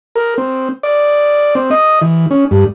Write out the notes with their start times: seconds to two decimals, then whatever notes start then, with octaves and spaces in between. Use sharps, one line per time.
0.16 A#4
0.38 C4
0.83 D5
1.55 C4
1.71 D#5
2.01 E3
2.31 C#4
2.51 G2